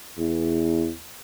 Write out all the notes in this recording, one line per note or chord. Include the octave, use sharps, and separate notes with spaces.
E2